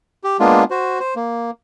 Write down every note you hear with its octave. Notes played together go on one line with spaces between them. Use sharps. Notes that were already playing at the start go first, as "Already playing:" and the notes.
G4
G#3 A#3 B3 D4 F4
F#4 C5
C5
A#3